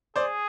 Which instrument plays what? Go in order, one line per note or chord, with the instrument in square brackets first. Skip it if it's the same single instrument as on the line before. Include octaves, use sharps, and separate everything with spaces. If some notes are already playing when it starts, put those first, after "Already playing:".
[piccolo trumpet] G#4 [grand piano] C5 D5